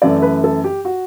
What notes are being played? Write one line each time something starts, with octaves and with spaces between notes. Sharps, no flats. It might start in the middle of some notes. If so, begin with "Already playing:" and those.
F#2 E3 A3 D5
B4
A4
G4
F#4